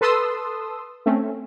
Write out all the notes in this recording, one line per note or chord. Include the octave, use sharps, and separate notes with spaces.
A4 B4 A5 C6 D#6 E6
A3 C4 C#4